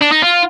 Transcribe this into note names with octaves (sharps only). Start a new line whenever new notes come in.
D4
D#4
F4